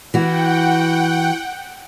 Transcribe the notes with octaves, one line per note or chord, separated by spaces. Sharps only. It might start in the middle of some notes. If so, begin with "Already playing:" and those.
E3 F#4 F#5 G5